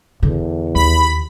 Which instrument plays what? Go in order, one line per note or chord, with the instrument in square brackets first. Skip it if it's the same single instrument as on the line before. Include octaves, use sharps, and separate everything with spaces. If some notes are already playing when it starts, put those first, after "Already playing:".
[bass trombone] E2 [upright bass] D3
[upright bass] D#2 [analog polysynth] B5